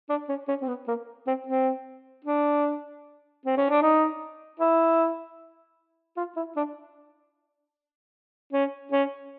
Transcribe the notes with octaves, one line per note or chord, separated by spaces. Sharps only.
D4
C#4
C#4
C4
B3
A#3
C4
C4
D4
C4
C#4
D4
D#4
E4
F4
E4
D4
C#4
C#4